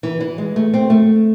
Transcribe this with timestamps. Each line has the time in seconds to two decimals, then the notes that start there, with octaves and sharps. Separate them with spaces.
0.03 E3
0.20 E3
0.38 G#3
0.56 A3
0.74 C4
0.90 A3